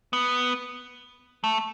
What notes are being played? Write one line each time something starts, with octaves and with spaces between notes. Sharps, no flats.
B3
A3